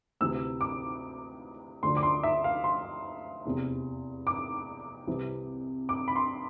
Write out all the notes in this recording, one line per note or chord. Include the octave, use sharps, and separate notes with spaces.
D2 C3 E3 E6
D6
D2 D3 F3 C6
D6
C6
E5
F5
C6
F1 E2 C3
D6
C2 C3 E3
D6
B5
C6